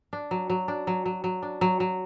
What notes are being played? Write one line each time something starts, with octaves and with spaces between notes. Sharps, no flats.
D4
F#3
F#3
D4
F#3
F#3
F#3
D4
F#3
F#3